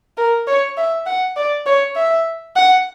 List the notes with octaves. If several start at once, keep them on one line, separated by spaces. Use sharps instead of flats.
A#4
C#5
E5
F#5
D5
C#5
E5
F#5